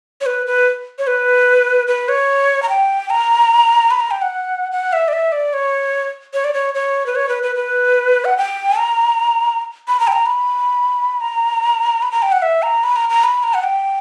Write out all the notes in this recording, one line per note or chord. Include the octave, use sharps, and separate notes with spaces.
C#5
B4
B4
C#5
B4
B4
C#5
A#5
G5
A#5
B5
A#5
G5
F#5
F#5
E5
D5
E5
D5
C#5
C#5
D5
C#5
C#5
B4
C#5
B4
B4
B4
F#5
G5
A#5
B5
A#5
G5
A#5
B5
A#5
B5
A#5
G5
F#5
E5
A#5
B5
A#5
A#5
B5
A#5
F#5
G5